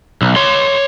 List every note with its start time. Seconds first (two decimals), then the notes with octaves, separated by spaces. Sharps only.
0.22 B1
0.36 C#5 C6